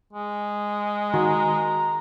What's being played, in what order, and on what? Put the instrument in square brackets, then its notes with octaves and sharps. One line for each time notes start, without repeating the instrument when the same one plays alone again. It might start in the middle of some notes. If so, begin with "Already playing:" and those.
[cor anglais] G#3
[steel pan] D#3 F#4 [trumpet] A#5